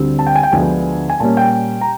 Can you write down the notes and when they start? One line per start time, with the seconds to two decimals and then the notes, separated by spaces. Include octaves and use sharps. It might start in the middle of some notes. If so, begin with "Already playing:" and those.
Already playing: D2 D3 G3 C4
0.19 A5
0.27 G5
0.36 G#5
0.43 G5
0.52 D2 D3 F3 G#3 B3 G#5
1.10 G#5
1.20 A#2 G3 A#3 C#4 A5
1.37 G5
1.81 A#5